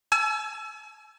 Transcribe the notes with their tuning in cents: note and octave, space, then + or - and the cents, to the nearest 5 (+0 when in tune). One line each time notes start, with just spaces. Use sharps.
G#5 +45 E6 +20